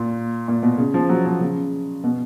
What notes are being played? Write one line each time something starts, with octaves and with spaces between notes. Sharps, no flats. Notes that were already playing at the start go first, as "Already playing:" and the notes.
Already playing: A#2
A#2
B2
C#3
F3
F#3
F3
C#3
B2